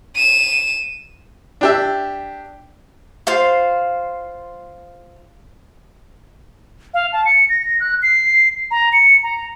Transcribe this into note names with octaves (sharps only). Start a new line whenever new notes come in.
D#7 E7
D4 G4 E5
F4 C5 F5
F5
A5
C#7
A#6
F#6
C7
A#5
C#7
A#5